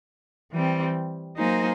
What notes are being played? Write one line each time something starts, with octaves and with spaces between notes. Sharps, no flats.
E3 G3 C4
F#3 A#3 D#4 G#4 C5